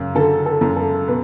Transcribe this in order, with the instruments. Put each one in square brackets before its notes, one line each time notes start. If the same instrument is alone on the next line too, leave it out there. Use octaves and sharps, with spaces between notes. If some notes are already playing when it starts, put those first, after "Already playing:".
Already playing: [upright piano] F#2 C#3
D3 A4
A4
F#2
A4
B2 B4